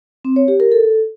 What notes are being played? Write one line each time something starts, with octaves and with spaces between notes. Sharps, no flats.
C4
C#5
G4
A#4
A4